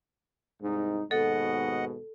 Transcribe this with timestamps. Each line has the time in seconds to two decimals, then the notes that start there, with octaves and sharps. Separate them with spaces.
0.62 C2 G#2 D#4
1.11 D#2 G#2 B2 A4 D#5 F#5